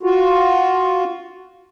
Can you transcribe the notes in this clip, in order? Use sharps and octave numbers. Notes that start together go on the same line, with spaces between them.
F4 F#4